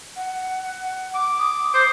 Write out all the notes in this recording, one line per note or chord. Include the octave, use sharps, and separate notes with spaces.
F#5
D6
D#6
C5